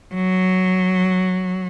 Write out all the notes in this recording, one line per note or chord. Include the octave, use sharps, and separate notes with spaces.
F#3